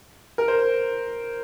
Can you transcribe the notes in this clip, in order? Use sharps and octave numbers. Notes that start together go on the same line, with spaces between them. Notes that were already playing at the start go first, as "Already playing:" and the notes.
A#4
C5